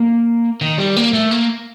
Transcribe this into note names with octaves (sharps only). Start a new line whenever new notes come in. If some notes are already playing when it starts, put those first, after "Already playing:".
Already playing: A#3
D#3
G3
A#3
A3
A#3